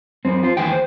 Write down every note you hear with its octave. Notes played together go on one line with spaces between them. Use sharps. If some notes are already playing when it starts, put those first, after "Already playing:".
F#2 C4
F4 C5
D#2 E3 G#4 G5
C5